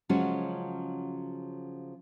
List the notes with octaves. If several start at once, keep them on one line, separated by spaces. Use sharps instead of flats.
C#3 F3 F#3 G#3 C#4 F#4